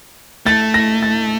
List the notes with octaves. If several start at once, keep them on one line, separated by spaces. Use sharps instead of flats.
A3 A6
A#6
A6